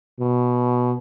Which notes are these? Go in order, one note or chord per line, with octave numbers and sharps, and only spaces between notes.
B2